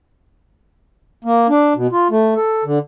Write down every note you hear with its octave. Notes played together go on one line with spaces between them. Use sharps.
A#3
D4
B2
F4
A3
A4
D3